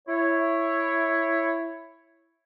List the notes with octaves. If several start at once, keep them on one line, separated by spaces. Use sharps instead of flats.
E4 C#5